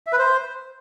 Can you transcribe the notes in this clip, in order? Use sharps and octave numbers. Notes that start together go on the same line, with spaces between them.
E5
B4
C5